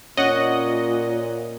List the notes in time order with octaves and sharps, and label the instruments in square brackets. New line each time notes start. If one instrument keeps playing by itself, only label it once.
[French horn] A#2 [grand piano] C#4 [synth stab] D#5 F#5